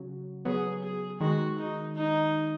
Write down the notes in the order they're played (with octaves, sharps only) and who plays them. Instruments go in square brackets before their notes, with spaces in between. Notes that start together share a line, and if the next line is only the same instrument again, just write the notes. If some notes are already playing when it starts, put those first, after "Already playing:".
Already playing: [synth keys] C#3 F#3
[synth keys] F#3 B3 [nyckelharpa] G#4
[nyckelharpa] G#4
[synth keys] D#3 G#3 [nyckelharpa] F#4
[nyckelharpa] D#4
D#4